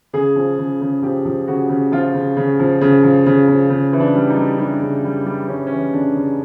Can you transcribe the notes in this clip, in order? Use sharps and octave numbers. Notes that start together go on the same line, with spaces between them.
C#3 G#4
F3
C#3
C#3
F3 G4
F3
C#3 F#4
C#3
F3 F4
C#3
C#3
F3
C#3
F3
C#3
F3
C#3
E3
D4
G3
D#4
G3
G3 D4
C#3
G3
G3
G3 C#4
C#4
E3
C#3 D4
C#3